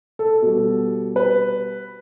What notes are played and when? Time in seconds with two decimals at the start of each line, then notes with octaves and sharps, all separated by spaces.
0.19 A4
0.42 B2 G3
1.16 B4